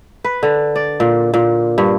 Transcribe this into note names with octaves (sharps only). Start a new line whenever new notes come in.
B4
D3
D5
A#2
A#2
G2